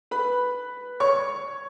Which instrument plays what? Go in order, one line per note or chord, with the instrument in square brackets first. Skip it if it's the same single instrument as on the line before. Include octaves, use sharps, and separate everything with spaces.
[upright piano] B4 B5
C#5 C#6